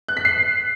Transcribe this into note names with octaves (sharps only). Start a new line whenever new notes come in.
F#6
B6
C7